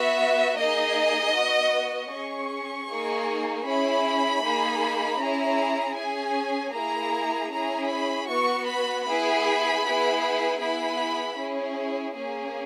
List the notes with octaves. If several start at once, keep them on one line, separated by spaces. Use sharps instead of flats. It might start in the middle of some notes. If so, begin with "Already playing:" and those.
Already playing: B3 F#4 E5
A#3 D#4 G#4 D#5
B3 F#4
C#4 G#4 C#6
A#3 D#4 G#4
C#4 E4 G#4 B5
A#3 D#4 G#4
C#4 E4 G#4 A#5
C#4 G#4 G#5
A#3 E4 G#4 A#5
C#4 E4 G#4 A#5
B5
B3 F#4 C#6
B5
B3 E4 G#4 B5
B3 E4 G#4
B3 E4 G#4 B5
C#4 E4 G#4
A#3 C#4 G#4